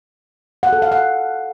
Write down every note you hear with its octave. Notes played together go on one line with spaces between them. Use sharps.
F#5
A4
F5
F#5